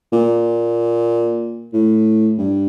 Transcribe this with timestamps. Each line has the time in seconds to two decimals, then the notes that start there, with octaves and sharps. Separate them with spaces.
0.13 A#2
1.73 A2
2.38 G2